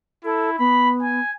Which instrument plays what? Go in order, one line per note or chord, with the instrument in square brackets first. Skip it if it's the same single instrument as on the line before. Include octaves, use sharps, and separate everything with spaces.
[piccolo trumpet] E4 [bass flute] A4
[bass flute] B3 [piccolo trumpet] B5
[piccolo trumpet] G#5